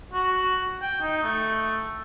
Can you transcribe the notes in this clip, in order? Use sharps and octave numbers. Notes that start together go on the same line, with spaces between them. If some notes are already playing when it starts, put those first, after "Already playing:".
F#4
G5
D#4
A3